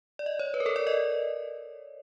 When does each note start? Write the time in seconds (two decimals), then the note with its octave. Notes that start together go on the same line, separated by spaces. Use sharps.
0.19 D5
0.26 D#5
0.39 C#5
0.54 B4
0.60 A#4
0.66 A4
0.76 D5
0.87 D#5